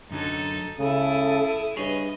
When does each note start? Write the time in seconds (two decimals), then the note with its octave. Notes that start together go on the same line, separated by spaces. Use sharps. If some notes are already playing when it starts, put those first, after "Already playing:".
0.11 F#2 D3 F#3 D#4 A4
0.79 C#2 C#3 E4 A4 D#6
1.77 G2 G#4 B4 C#5 D#5